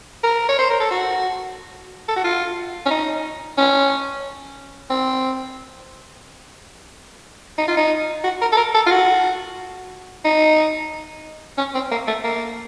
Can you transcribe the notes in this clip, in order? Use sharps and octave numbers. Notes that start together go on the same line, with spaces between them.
A#4
C#5
C5
A#4
A4
F#4
A4
F#4
F4
C#4
D#4
C#4
C4
D#4
F4
D#4
F#4
A#4
A4
A#4
A4
F4
F#4
D#4
C#4
C4
A#3
A3
A#3